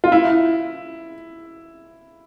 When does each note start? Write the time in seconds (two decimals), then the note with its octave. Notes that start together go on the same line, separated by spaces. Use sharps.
0.04 F4
0.12 E4